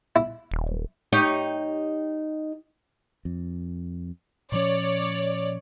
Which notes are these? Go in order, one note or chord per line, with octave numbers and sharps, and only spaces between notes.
E4
D#1
D#4 G4 C#5
F2
A#2 F3 C#4 C#5 D5